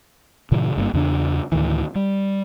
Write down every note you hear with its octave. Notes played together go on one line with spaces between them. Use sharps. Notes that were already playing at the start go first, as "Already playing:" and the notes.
G2 A#2 C#3 E3
F#1 G2 C#3 A#3
E2 C#3 D4
D2 A2 D#3 E3
G3